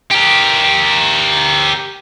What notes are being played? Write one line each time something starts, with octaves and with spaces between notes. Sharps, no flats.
G4 A#4